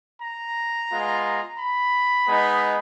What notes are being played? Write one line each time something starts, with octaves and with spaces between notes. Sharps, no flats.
A#5
G#3 B3 F4
B5
G#3 B3 D#4